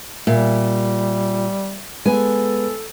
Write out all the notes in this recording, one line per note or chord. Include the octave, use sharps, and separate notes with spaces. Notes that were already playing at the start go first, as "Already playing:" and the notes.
A#2 G3 E5
G#3 B3 A4 B4 G#5